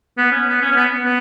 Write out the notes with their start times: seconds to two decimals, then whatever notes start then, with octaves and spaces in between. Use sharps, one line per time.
0.17 B3
0.31 C#4
0.47 B3
0.61 C#4
0.72 C#4
0.75 B3
1.05 B3